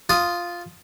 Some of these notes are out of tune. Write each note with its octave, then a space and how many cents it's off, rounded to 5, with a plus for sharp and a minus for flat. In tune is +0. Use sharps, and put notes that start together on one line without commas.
F4 +0 D#6 +0